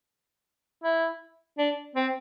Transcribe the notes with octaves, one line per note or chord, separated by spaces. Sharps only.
E4
D4
C4